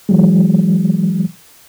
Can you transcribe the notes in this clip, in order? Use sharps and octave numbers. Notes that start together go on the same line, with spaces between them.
E3 F#3 G#3